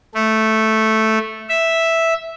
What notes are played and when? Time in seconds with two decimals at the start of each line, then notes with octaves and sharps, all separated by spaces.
0.14 A3
1.49 E5